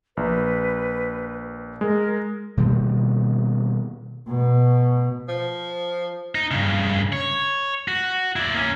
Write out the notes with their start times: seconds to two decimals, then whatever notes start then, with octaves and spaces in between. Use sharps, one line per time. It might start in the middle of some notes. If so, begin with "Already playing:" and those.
0.17 A#1 B4
1.81 G#3 A#4
2.57 B2 D#3 G3 A#3
4.28 B2
5.28 F3
6.35 D#4
6.51 G2 C#3
7.13 C#5
7.88 F#4
8.36 E4 D5
8.54 A#3 C#4